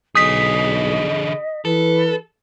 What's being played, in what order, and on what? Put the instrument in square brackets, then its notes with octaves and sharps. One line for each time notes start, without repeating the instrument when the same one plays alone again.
[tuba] B1 [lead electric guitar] D3 G#4 [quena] D#5 [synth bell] D#6 B6
[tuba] E3 [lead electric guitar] A4 [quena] B4